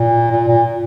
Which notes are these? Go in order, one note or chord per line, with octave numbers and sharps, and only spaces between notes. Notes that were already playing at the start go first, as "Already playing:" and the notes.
Already playing: A#2
A#2
A#2